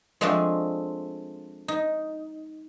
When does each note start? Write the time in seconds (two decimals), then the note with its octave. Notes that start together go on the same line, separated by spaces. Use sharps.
0.21 F3 G#3 A3 C4 D4
1.68 D#4